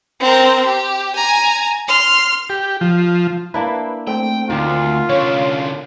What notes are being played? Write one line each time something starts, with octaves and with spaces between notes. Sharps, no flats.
C4 A#4
G4
G#5 A#5
C6 F6
G4
F3
A#3 D4 E4 B4
A3 C4 G5
D2 D#3 F4
D3 C#4 C#5